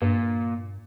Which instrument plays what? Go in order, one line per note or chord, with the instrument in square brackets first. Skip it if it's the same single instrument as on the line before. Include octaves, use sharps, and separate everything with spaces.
[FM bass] G2 [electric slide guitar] A#2